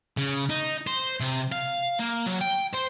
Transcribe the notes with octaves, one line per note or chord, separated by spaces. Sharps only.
C#3
D#4
C5
C3
F5
A#3
F#3
G5
C5